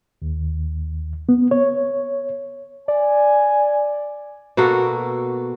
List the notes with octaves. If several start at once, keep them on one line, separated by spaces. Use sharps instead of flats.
D#2
B3
C#5
D5 G#5
B2 A#3 F#4 A4